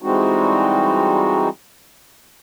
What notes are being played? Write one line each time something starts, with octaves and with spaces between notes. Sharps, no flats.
E3 G3 G#3 C4 D#4 F#4